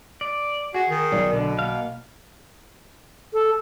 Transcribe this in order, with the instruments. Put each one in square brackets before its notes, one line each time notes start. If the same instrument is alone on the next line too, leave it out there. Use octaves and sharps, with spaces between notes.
[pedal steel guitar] D5
[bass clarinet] F#4 [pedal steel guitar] G#4
[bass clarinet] D#3
[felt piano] B1 D5
[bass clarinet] B2 [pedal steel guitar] D3
[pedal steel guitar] A#3 F5
[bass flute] A4